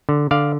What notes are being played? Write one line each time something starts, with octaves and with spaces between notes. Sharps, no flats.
D3
D3 D5 F5